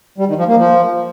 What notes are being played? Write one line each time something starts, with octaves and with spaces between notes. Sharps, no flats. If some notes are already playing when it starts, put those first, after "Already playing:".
G3
D#3
F3
A#3
F3